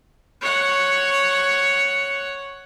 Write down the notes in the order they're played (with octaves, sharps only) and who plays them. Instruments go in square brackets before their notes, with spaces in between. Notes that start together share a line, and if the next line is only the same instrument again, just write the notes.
[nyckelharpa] C#5 F#5